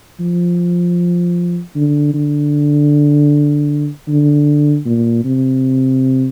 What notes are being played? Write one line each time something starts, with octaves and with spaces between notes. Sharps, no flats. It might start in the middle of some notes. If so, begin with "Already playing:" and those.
F3
D3
D3
D3
A#2
C3